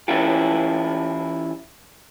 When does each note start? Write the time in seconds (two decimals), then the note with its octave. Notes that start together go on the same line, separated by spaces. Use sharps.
0.08 E3 C#4 E4 F4 G4